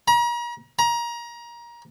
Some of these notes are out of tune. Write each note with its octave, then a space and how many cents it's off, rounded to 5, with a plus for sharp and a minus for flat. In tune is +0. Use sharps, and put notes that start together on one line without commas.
A#5 +40
A#5 +25